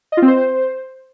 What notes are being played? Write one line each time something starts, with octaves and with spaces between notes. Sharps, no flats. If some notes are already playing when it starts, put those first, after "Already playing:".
D#5
F4
C4
C5